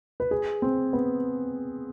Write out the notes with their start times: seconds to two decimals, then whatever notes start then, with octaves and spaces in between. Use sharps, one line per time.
0.20 B4
0.31 G#4
0.62 C4
0.93 B3